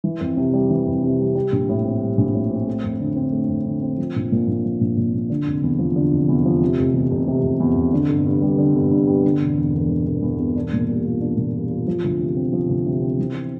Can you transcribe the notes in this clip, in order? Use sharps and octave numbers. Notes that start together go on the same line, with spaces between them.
E3
F2
C3
G3
E3
F2
C3
G3
G3
A#1
A2
C4
G3
A#1
A2
C4
A3
F2
D3
C4
A3
F2
D3
C4
F3
A#1
A#2
A#1
F3
A#1
A#2
A#1
D3
F1
E2
F3
D3
F1
E2
F3
C3
F1
E2
F1
C3
F1
E2
F1
D3
G1
G2
G3
D3
G1
G2
G3
D3
E1
E2
E1
D3
E1
E2
E1
D4
A#2
G3
F4
D4
A#2
G3
F4
F3
D2
C3
C4
F3
D2
C3
C4
E3